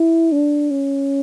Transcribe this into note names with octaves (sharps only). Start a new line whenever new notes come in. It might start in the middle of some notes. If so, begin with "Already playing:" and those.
Already playing: E4
D4
C#4